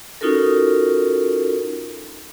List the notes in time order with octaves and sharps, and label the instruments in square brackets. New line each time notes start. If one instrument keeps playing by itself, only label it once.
[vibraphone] C#4 D#4 F4 F#4 A4 A#4